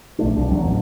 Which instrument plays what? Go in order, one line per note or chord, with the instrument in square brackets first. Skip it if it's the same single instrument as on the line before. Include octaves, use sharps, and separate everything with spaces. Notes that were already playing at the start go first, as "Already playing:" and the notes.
[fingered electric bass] A#1 A3 D4
B1 D4
E2 F#3
A1